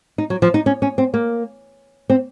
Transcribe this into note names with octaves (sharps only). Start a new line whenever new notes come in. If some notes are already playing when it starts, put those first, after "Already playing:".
D#4
F#3
F3
D#4
C#4
C#4
C4
A#3
C4